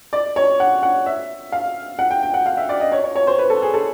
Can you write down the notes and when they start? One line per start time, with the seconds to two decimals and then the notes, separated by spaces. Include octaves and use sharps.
0.13 D5
0.36 C#5
0.60 F#5
0.83 F#5
1.06 E5
1.52 F5
1.99 F#5
2.11 G5
2.23 G5
2.34 F#5
2.46 F5
2.57 E5
2.69 D5
2.80 D#5
2.92 C#5
3.04 C#5
3.15 C#5
3.27 C5
3.39 B4
3.50 A4
3.62 G#4
3.74 A4